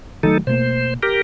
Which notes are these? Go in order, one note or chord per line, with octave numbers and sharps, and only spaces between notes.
D#3 F#3 A3 D#4 A4
B2 A3 A#3 C5
G4 A#4